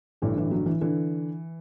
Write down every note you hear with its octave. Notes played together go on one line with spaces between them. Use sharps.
A1 G2 D3 E3
E3
F#3
E3
D3 E3